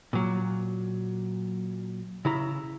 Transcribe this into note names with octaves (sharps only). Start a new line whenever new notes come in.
A#2 F#3
C#3 E4 A#5